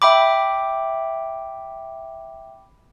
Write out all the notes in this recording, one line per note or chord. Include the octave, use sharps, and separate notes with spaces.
E5 G5 B5 D6